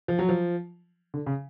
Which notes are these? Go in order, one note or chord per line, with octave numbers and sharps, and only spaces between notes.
F3
F#3
F3
D3
C#3